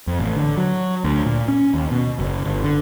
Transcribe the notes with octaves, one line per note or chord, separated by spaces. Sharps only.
F2
A1
D3
F#3
D2
A#2
C#4
D#2
B2
F#1
G1
D3